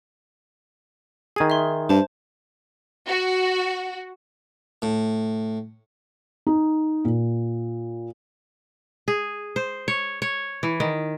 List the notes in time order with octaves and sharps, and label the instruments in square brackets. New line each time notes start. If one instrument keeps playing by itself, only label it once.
[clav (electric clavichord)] D#3 G#4 [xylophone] G#6 D#7
[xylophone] E5 C6
[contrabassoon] G2 [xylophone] C5 A5
[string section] F#4
[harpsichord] A2
[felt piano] D#4
A#2
[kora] G#4
C5
C#5
C#5
E3
D#3